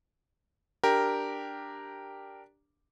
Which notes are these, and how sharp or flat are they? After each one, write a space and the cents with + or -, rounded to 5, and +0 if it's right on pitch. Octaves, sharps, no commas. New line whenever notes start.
D4 +0 G4 +0 A#4 +0